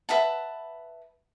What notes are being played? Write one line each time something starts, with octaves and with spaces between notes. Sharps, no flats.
B4 E5 F#5 A5